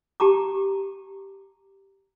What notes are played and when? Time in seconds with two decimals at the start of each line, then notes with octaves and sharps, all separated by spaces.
0.20 G4 A5 A#5 D6